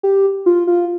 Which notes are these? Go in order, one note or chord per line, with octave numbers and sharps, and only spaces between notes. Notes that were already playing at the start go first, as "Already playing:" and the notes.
G4
F4
F4